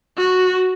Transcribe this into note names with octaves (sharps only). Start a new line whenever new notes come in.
F#4